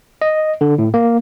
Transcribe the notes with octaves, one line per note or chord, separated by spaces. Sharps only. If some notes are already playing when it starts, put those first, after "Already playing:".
D#5
D3
A2
A#3